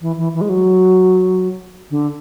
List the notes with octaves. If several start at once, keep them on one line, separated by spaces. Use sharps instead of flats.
E3
E3
E3
G#3
F#3
D3